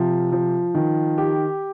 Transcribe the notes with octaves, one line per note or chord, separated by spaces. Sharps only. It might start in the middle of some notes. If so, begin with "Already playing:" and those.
Already playing: C3 F3
F3
D#3
G4